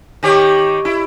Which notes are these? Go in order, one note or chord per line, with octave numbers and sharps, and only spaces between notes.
D#3 G4 C#5
E4